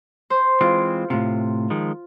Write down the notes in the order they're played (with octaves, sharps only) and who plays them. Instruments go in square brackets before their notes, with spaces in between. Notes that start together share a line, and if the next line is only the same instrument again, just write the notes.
[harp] C5
[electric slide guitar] E3 G#3 C4 [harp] F4
[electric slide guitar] A2 C3 [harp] F4
[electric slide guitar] D#3 F3 G#3